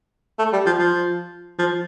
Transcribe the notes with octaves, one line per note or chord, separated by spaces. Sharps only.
A3
G3
F3
F3
F3